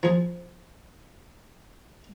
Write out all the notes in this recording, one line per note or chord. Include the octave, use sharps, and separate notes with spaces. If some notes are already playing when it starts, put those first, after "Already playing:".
F3 G#4